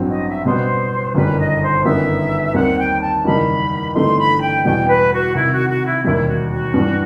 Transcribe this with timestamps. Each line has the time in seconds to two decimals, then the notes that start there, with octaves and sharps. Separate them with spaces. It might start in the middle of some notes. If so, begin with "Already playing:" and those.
Already playing: A1 G2 F#3 C4
0.10 D#5
0.27 E5
0.45 B2 G3 B3 C5
1.15 G1 F#2 D#3 G3 B4
1.39 D#5
1.62 C5
1.85 G1 F#2 D#3 G3 B3 E5
2.54 D#2 D#3 G3 C4 F#5
2.77 G5
3.01 A5
3.24 F#1 E2 D#3 G3 D#4 B5
3.95 G1 G2 E3 A3 D#4 C6
4.18 B5
4.41 G5
4.64 E2 B2 G3 G5
4.88 B4
5.12 F#4
5.35 C2 C3 D#3 E4
5.51 F#4
5.70 F#4
5.87 E4
6.04 E1 D#2 D#3 G3 E4
6.28 F#4
6.51 F#4
6.74 G2 E3 G3